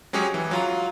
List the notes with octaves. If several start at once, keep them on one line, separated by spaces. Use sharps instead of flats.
F#3 G#3 C#4 G4 G#4 C#5
E3
F#3 F4 A#5